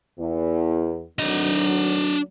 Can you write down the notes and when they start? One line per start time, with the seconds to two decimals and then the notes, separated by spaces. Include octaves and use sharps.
0.18 E2
1.19 D2 D#3 F#3 D4 D#5